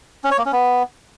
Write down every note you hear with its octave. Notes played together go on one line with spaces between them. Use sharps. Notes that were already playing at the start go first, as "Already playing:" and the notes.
C#4
C#5
A#3
C#4
B3